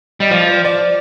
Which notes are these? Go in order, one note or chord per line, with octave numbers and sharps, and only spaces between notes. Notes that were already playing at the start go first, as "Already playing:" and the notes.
G3 D#5
F3 D5
C5
D5